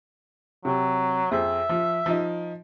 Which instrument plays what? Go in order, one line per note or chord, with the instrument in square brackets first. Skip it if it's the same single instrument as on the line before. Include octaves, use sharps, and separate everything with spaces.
[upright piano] C3 [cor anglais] F#3
[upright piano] F2 G#4 C5 [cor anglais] E5
[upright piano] F3
F3 D#4